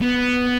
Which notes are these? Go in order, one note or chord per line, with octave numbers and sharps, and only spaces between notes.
B3